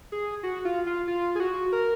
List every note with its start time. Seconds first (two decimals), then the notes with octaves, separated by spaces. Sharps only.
0.12 G#4
0.43 F#4
0.65 F4
0.87 F4
1.07 F4
1.35 G#4
1.40 F#4
1.72 A#4